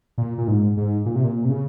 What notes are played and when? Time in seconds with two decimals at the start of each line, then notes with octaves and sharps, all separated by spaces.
0.18 A#2
0.38 A#2
0.48 G#2
0.77 G#2
1.06 A#2
1.15 C3
1.24 A#2
1.45 C3
1.50 C#3